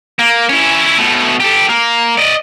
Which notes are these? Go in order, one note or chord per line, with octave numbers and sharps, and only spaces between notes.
A#3
C#4 E4
B2 A3
G4 A4
A#3
D5 D#5